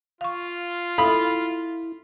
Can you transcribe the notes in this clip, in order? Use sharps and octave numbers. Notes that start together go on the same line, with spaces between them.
F4 F5 C#6
E4 A4 F5 B5 D#6